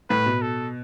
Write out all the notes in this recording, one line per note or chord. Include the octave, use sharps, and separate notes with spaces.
A2 B4
B2
A4